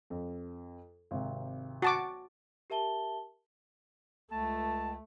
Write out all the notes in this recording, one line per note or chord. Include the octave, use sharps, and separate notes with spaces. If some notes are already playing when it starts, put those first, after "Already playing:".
F2
G#1 C3
F#4 A5 D6
G4 A#4 E5 A5 G7
C#2 A3 A5